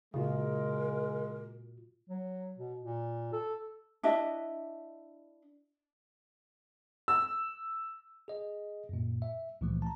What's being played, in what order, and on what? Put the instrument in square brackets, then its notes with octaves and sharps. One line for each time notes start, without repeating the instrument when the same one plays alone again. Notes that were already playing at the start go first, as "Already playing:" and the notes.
[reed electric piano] A#2 F4 F#4 [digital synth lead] C#3 [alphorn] G#3 [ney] A#4
[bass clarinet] F#3
B2
A#2
A4
[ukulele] D4 E4 D#5 E5
[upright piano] E6
[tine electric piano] G#4 D#5
F#2 A#2
E5
C#2 A#2 E3 F3 A3
A5 A#5